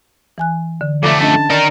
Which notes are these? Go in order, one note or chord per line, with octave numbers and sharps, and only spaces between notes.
E3 G#5 F#6
D3
F2 A3 A4 D5 E5
C#4 D4 D#5 A5
D#4 A#4 D5 A6